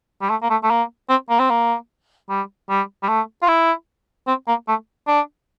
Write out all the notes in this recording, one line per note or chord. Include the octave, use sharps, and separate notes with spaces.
G3
A3
A#3
A3
A3
A#3
C4
A#3
C4
A#3
G3
G3
G3
A3
F4
E4
C4
A#3
A3
D4